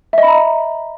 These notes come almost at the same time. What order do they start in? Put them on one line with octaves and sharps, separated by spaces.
E5 D#5 B5 A#5